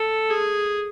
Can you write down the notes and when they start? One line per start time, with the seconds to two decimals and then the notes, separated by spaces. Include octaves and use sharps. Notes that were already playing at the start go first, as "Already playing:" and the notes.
Already playing: A4
0.31 G#4